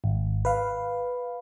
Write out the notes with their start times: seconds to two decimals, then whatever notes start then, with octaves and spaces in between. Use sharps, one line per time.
0.04 G#1
0.45 B4 F5